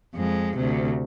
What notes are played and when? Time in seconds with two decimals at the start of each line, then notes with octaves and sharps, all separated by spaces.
0.15 F2 G#3
0.56 D2 C3